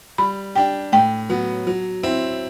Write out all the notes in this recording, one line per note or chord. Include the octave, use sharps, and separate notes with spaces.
G3 B5
D4 G4 G5
A2 G5
F#3 B3
F#3
C4 E4